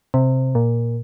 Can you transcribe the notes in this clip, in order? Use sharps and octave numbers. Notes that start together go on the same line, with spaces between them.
C3
A#2